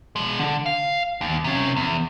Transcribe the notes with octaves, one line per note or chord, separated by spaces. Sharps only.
B2 G#3
D3
F5
D#2
C3 C#4
E2